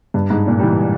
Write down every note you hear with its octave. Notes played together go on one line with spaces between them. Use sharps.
G2
G#2
A#2
G3
E3